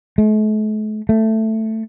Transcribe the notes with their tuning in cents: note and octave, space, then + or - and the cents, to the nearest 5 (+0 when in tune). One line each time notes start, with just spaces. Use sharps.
A3 -45
A3 +5